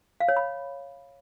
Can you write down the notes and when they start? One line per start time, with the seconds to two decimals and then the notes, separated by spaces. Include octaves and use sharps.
0.20 F5
0.29 C#5
0.37 B5